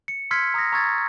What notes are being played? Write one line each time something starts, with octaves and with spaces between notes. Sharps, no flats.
C#7
C6 E6 F6 G#6 B6 C#7
A#5 D#6 F6 A#6
A#5 C#6 E6 G#6 A6